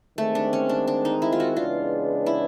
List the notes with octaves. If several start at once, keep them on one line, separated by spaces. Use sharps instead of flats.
D#3 G#3 A3 C4
D4
C#4
D4
D4
D#4
E4
F4
F#4
C#3 E3 G#3 B3 D4 F4
E4